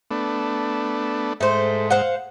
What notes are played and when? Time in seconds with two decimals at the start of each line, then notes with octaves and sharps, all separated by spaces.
0.11 A3 B3 D4
1.41 G#2 A3 C5
1.90 C5 F5 F#5